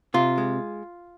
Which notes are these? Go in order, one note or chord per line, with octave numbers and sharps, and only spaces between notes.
C3 F4
G#3